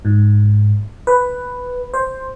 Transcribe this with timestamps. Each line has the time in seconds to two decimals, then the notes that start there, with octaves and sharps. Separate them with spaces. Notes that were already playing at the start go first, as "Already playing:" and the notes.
0.05 G#2
1.07 B4
1.93 C5